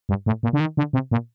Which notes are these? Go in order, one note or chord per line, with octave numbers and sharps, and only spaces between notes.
G2
A2
A#2
D3
D#3
D3
C3
A#2